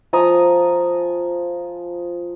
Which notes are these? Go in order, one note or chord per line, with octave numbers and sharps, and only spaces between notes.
F3 G#5 A#5 D#6